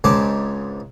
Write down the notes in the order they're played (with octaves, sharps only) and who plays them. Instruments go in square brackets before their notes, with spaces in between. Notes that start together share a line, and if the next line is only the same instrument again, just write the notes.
[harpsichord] C#2 G#2 C4 C#4 D5 A5